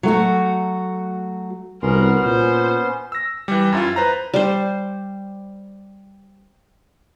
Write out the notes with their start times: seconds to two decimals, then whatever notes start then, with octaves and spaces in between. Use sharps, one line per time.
0.03 F#3 A3 F#4
1.83 C2 B3 C#4 F#4 A#4 C6
2.25 A#2 C5
3.12 E6 A#6
3.48 E3 G3
3.72 F#2 E4 F4
3.96 B4 C5 A#5
4.34 G3 C5